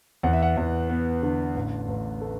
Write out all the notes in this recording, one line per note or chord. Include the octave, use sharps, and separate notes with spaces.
E2 F#5
E5
F#5
E2
B3
D3
A1
A1
A3